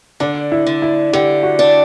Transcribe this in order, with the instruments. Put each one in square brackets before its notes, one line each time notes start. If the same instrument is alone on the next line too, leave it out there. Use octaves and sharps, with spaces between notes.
[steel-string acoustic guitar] D3 [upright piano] D4
[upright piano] E4
[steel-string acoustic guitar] D3
[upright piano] E4
[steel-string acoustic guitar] D3 [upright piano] G4
[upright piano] F#4
[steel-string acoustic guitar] D4